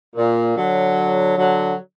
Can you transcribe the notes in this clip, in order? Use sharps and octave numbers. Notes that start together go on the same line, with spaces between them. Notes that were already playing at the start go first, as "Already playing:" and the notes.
A#2
D3 F#3
D3 F#3